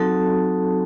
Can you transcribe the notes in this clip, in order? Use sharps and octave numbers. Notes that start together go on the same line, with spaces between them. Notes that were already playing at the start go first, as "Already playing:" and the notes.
Already playing: F#3 C4 D#4 F#4 A4 A5